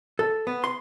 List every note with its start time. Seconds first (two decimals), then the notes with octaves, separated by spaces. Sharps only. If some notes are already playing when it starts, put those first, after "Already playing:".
0.19 A4
0.47 B3
0.64 C6